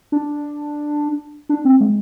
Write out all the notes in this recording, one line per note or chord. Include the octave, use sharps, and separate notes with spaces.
D4
D4
C4
G#3